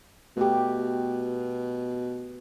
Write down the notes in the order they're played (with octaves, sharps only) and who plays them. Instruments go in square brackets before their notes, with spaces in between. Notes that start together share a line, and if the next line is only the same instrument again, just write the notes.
[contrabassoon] B2 [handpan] A3 G4